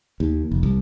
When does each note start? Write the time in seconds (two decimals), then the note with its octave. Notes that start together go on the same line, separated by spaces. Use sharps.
0.20 D#2
0.52 F1
0.63 C2